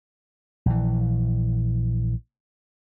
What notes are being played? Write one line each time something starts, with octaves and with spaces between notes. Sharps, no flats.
A#1 E3